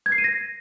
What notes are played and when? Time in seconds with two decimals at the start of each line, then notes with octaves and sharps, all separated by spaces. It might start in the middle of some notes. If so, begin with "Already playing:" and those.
0.06 G#6
0.12 C7
0.18 D#7
0.24 A#6